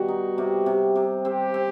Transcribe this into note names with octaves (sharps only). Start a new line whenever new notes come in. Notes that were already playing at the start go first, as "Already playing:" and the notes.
Already playing: B2 D#3 G3 F#4
D#4
C3
C3
C3
C4 G4
C4